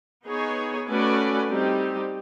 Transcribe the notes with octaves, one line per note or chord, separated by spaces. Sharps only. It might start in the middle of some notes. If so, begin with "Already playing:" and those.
B3 D#4 G#4 C#5
A3 C#4 F#4 B4 D5
G3 C4 D#4 G4